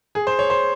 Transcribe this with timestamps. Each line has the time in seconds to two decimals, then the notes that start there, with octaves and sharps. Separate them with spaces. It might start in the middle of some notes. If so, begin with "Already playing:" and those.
0.15 G#4
0.27 C5
0.39 C#5
0.50 C5